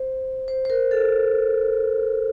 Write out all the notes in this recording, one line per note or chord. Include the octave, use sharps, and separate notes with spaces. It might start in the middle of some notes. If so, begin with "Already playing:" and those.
Already playing: C5
C5
C5
A#4
A4